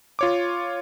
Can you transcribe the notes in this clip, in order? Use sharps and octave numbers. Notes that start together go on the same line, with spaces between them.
F4 C#5 D6